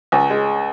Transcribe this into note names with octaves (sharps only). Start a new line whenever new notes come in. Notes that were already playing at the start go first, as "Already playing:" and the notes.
C#2
G#3